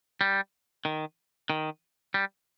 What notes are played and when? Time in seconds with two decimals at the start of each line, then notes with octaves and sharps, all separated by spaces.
0.21 G3
0.85 D#3
1.50 D#3
2.14 G3